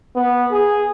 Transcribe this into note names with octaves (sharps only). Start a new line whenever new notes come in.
B3
G#4